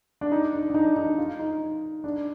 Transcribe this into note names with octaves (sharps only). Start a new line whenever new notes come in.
D4
D#4
D4
D4
D#4
D#4
F4
D#4
D4